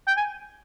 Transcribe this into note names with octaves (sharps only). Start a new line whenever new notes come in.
G5
G#5